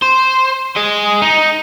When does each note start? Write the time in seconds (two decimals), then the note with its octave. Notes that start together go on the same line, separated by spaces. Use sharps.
0.02 C5
0.77 G#4 D#5
1.22 D#4